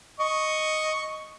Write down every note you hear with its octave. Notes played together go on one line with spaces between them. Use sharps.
D#5 C#6